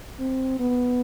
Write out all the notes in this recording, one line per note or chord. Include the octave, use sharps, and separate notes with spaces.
C4
B3